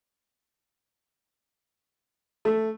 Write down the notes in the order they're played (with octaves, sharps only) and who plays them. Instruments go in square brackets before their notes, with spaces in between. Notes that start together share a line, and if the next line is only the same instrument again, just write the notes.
[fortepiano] A3